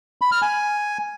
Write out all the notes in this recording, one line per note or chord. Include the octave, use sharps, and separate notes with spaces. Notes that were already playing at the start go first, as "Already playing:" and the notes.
B5
F6
G#5